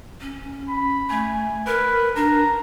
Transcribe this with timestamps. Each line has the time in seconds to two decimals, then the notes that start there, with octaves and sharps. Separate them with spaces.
0.21 C#4
0.69 B5
1.10 A3 G#5
1.67 A#4 B4
2.16 D4 A#5